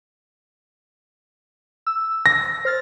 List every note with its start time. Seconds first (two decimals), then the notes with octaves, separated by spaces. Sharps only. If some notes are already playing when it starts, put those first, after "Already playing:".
1.87 E6
2.26 A#6
2.65 C5 F6 A6